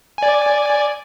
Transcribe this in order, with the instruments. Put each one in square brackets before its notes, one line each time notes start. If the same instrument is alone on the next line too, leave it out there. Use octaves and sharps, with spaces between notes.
[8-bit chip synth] D5 G#5